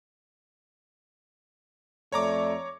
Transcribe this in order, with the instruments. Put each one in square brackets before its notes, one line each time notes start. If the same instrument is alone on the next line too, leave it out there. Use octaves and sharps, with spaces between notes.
[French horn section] F2 A3 D5 [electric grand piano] C#5 A#5 D6